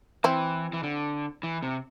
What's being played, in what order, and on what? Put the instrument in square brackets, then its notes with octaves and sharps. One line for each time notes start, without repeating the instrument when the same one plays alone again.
[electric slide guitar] E3 [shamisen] C4 E4
[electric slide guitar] E3
D3
E3
C3